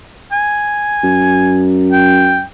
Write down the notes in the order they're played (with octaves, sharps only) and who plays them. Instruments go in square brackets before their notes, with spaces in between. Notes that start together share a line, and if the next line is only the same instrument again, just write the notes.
[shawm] G#5
[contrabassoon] F#2
[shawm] G5